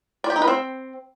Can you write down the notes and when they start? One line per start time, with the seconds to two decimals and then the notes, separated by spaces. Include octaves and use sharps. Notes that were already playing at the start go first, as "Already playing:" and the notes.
0.24 D5
0.30 G4
0.36 D#4
0.42 B4
0.48 C4